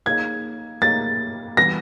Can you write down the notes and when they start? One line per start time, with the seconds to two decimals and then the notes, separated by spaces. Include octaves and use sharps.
0.06 A#3 D#4 G#4 C#5 F5 G#6
0.82 A#3 D#4 G#4 C#5 F5 A6
1.57 E3 G3 B3 E4 A#6